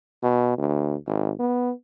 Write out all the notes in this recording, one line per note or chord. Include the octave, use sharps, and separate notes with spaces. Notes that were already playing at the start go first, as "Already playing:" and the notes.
B2
D2
G#1
B3